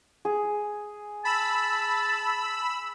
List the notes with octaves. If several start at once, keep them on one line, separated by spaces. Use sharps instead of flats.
G#4
A5 B5 E6